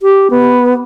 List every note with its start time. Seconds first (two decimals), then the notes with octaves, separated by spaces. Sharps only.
0.02 G4
0.31 B3